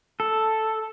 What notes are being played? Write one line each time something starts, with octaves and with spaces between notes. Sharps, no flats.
A4